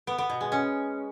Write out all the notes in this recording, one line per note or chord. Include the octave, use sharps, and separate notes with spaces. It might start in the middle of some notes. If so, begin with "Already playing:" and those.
B3
B3
B2
G#3
C#4